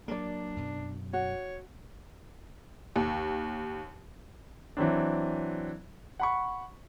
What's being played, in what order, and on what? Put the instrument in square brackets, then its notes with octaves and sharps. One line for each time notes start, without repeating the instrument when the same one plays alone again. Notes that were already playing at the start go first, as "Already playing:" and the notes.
[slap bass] F#3 A#3 [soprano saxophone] D4 [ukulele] A#4 D5
[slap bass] F#2 B2
[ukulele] F#4 [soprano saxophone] C#5
[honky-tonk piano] D#2
[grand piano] E3 F#3 C4 D4
F#5 B5 C#6